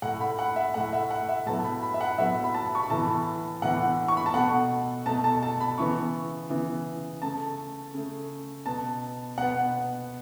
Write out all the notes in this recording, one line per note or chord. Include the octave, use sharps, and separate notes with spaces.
A2 A3 F#5
B5
F#5
E5
A2 A3 F#5
E5
F#5
E5
A2 F#3 B3 A5
B5
B5
E5
F#5
A2 F#3 B3 E5
B5
A5
C#6
B5
A2 E3 B3 A5
A2 E3 B3 F#5
C#6
B5
A5
B2 A3 F#5
B2 A3 A5
A5
A5
B5
C#3 E3 B3 C#6
C#3 E3 B3
C#3 A3 A5
C#3 A3
B2 B3 A5
B2 B3 F#5